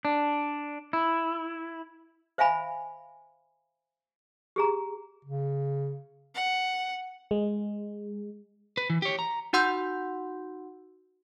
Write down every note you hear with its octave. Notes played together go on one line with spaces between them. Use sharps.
D4
E4
C5 E5 F5 G#5 B5
G4 G#4 A#5
C#3
F#5
G#3
B4
E3
G4 C#5
A#5
D#4 F#4 F#5 C6 E6 G6